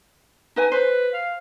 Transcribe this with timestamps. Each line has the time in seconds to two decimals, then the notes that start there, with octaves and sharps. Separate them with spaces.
0.56 D#4 B4 G#5
0.72 B4 C5
1.14 F5